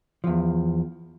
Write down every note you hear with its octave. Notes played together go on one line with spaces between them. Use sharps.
E2 F3